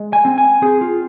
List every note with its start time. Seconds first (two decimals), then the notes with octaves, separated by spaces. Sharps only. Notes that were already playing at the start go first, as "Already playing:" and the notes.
Already playing: G#3
0.13 G#5
0.25 C4
0.38 G#5
0.62 C4 G#4
0.81 F4